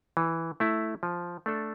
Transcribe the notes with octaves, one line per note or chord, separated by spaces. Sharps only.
E3
A3 E4
F3
A3 D4 A4